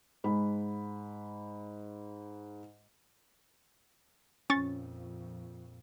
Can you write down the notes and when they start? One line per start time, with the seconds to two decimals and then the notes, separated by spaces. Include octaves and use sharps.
0.24 G#2 B5
4.50 A#1 F2 C#4 C#6 A6